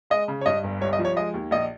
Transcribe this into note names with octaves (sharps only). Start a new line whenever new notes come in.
G#3 D#5
C#3
C#5
G2 D#5
G1
C2 C#5
D#5
F3
C#5
G#3 D#5
D#2
A#1 D#5